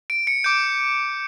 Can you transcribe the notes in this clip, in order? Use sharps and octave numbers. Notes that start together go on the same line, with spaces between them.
D7
C#7
D6 G6 D7